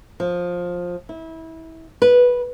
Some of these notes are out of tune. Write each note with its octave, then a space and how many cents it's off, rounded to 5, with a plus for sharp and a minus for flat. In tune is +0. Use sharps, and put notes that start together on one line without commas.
F3 +15
E4 -25
B4 -10